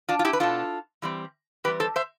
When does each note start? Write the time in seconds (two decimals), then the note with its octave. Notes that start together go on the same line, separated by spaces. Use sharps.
0.09 D4 F4
0.19 F4
0.25 E4 G4
0.33 B4
0.40 B2 B3 D4 F4 A4
1.02 E3 G3 C4
1.64 E3 G3 C4 G4 B4
1.80 A4 C5
1.96 C5 E5